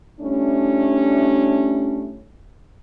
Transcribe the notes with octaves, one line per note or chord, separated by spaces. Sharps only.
G3 A3 C#4 D4 E4